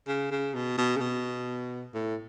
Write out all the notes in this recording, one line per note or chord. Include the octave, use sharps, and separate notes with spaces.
C#3
C#3
B2
B2
C#3
B2
A2